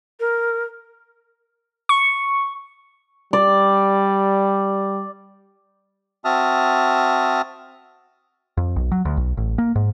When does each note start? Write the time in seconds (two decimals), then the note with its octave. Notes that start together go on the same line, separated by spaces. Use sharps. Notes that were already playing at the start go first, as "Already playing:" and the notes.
0.20 A#4
1.89 C#6
3.33 G3 D5
6.25 C4 F#4 E5 A5 D#6 F6
8.57 F2
8.76 B1
8.92 F#3
9.05 D2
9.17 B1
9.37 A1
9.58 A#3
9.75 G#2